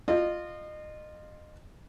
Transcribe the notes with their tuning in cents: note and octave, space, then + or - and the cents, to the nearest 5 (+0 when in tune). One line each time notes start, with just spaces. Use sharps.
F4 +0 D#5 -30